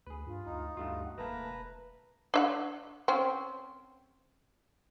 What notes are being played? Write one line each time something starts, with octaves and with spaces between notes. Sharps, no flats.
D2 G#4 B4
G2 F4
D2 D#4
D2 G2 A3 F4 F#4
F#5
E1 A3 A#3 B4 A5 A#5
D4 E5 F#5
C4 C#4